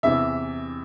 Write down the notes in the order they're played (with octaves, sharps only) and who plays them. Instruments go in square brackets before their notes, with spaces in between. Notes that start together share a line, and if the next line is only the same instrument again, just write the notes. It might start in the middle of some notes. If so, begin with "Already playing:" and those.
[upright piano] E2 C3 E3 E5